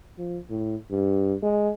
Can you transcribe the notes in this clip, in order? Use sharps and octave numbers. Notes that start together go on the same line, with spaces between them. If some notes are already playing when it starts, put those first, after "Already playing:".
F3
A2
G2
G#3